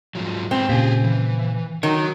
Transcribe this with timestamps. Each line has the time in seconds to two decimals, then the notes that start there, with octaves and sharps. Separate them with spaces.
0.15 G#2 F3 F#3
0.51 G#2 B3 C4 G5
0.69 A#2 C#3 G4 G#4 G#5
1.04 E3
1.83 D#3 F#4 C#5